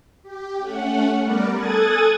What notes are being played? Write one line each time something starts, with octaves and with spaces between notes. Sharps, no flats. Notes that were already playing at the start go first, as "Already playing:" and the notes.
G4
A3 C#4 F#5
G3 B3 A#4 B4 D5
A4 G#5 D#6 F#6 G#6 A6